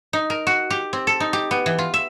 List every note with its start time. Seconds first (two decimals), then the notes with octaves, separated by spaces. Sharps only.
0.13 D#4
0.30 A#4
0.47 F#4
0.70 G4
0.93 C4
1.07 A4
1.20 D#4
1.33 G4
1.51 B3
1.66 E3
1.79 F4
1.94 E5